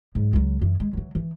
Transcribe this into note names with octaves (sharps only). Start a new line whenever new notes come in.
G#2 F#3
C#2 F#3
F#2 E3
G#3
E3 F#3
E3